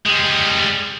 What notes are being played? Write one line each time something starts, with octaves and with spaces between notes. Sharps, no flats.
G3 G#3